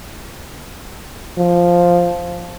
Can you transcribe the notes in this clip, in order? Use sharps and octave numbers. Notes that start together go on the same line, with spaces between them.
F3